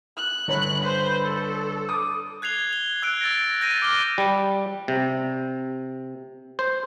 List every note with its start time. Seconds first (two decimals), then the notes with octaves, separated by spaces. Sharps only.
0.17 F#6
0.48 G1 C#5 B5
0.81 B4 C5
1.21 A4
1.89 D6 D#6
2.42 F#6 G#6 C7 F7 G7
2.73 G7
3.02 E6 F#6 G#6 D7
3.21 E6 A6 A#6
3.61 G6 A6 A#6 D7 D#7
3.82 D6 F6 G7
4.18 G3
4.88 C3
6.59 C5